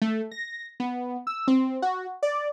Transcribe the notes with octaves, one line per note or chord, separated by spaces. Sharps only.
A3
A#6
B3
E6
C4
F#4
D5